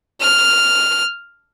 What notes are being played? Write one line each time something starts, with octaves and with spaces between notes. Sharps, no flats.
F6